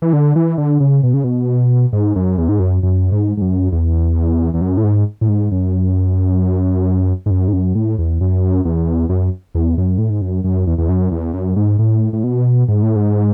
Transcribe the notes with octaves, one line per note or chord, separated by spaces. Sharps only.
E3
D3
E3
D3
C#3
B2
C#3
B2
G#2
F#2
E2
G#2
F#2
F#2
G#2
G#2
F#2
E2
E2
F#2
A2
G#2
A2
G#2
F#2
G#2
F#2
G#2
F#2
A2
E2
F#2
E2
F#2
E2
F#2
A2
G#2
F#2
F#2
E2
E2
F#2
E2
F#2
G#2
A2
A2
B2
G#2
A2
G#2